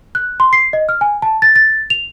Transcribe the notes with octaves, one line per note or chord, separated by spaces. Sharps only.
F#6
C6
C7
D#5
F6
G#5
A5
A6
A6
F7